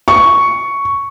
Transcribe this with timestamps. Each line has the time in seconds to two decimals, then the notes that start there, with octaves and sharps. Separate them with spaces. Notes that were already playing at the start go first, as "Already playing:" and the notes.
0.08 C#6